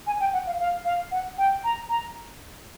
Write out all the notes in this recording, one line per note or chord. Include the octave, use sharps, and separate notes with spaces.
G#5
G5
F#5
F5
F5
F5
F#5
G5
A#5
A#5